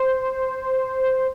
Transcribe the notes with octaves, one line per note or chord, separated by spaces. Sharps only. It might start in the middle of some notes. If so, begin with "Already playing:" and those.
Already playing: C5